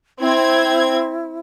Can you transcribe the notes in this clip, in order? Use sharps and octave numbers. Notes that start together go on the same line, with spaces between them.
C4 E4 G#6